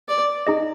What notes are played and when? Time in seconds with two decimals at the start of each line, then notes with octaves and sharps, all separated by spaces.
0.08 D5
0.47 D#4 G#4 D#5